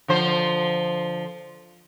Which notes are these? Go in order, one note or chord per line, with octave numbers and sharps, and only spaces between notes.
D3 F3 C5